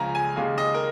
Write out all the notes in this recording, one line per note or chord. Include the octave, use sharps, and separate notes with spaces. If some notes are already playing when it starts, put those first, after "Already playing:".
Already playing: C#2 C#3 F3 G#5 A#5
G#5
D#2 C#3 G#3 F5
D#5
A#4